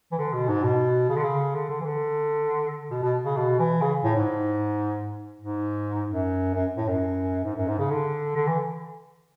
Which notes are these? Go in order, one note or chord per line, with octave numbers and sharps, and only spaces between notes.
E3
D3
B2
G#2
B2
C#3
D3
C#3
D3
D3
E3
D3
B2
B2
C#3
B2
E3
C#3
A2
G#2
G#2
F#2
F#2
A2
F#2
G#2
F#2
G#2
C#3
D3
D3
E3